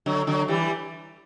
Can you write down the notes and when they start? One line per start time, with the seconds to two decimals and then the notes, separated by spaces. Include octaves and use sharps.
0.06 D3 F#3
0.27 D3 F#3
0.48 E3 G3